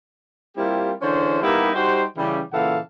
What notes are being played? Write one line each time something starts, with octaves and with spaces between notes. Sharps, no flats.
G3 A#3 C4 E4 F4 G4
D3 E3 C#4 G#4 C5
G3 A#3 B3 D#4 E4 G4
G3 D#4 F#4 G4 C5
C#3 E3 G3
A#2 C#3 E3 A4 F5 F#5